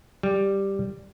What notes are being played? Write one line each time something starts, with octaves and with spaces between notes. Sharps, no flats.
G3